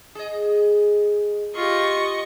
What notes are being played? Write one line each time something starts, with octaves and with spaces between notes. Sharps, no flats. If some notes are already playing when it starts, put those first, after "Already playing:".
G#4 D#5
F4 G4 D#5 C#6